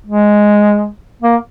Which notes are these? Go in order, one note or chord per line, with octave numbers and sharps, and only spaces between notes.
G#3
A#3